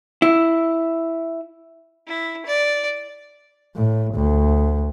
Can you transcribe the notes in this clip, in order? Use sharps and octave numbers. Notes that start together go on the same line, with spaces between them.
E4
E4
D5
A2
D2